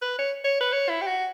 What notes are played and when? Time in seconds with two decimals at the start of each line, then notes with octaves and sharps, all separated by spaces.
0.02 B4
0.19 C#5
0.44 C#5
0.61 B4
0.72 C#5
0.89 E4
1.02 G4
1.07 F#4